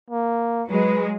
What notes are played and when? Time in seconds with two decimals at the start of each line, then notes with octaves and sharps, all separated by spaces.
0.10 A#3
0.70 F#3 G#3 B4